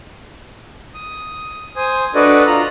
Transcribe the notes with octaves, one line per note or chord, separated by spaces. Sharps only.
D#6
C5 G#5 D#6
D4 F#4 A4 B4 D5 D#5
F4 A#5 F#6